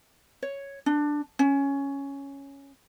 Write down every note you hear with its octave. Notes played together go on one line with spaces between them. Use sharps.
C#5
D4
C#4